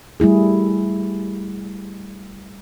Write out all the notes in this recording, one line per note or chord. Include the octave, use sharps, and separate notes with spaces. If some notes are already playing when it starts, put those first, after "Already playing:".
G3 A3 E4 G#4